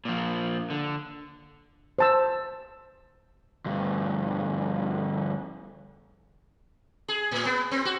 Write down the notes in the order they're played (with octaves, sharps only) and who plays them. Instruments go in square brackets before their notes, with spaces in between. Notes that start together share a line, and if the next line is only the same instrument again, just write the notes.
[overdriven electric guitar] A#2 F3
D3
[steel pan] C5 A5 E6
[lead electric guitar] D2 G2
[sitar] G#4
A2
B3
C4
F#4